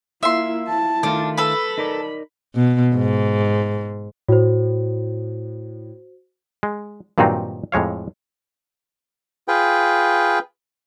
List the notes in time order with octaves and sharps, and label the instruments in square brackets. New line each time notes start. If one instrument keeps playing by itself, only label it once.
[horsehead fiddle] A#3 E4 [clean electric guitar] F4 [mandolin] E5 C6
[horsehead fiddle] E4 A5
[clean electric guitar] D#3 A3 F4 [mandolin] D4
[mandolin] A4 B4 [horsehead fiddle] B5
[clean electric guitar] D#4 A#4 D5
[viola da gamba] B2
G#2
[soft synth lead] A2 [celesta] F#4 C5
[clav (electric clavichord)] G#3
G2 A#2 D#3 F#3 C4 D#4
F2 A2 G#3 C#5 F5
[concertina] F4 G#4 B4 G5